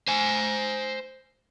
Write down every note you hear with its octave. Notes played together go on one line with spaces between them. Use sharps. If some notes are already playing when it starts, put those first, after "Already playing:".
C5 G#5